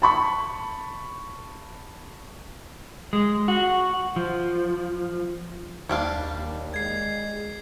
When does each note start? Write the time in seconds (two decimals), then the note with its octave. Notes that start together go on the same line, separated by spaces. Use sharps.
0.02 A5 B5 C#6
3.13 G#3
3.48 F#4
4.16 F3
5.89 D#2 G3 D4 F5
6.74 G#3 G#6 C7